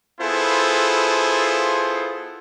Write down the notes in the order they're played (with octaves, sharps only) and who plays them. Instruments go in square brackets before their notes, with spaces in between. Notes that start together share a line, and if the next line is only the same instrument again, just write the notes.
[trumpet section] B3 E4 F4 G#4 A4 C5